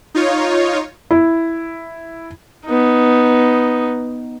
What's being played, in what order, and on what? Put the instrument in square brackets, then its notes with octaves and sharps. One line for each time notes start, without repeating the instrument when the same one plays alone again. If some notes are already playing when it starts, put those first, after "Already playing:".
[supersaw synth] D#4 F4 C#5
[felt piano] E4
[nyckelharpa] B3 D#4